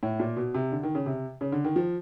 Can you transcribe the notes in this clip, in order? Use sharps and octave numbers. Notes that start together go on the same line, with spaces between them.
A2
A#2
B2
C3
D3
D#3
C#3
C3
C#3
D3
D#3
F3